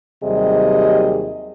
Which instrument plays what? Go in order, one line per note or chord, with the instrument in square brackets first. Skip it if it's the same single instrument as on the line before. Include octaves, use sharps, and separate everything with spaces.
[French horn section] D#2 C3 F#3 G3 G#4 D#5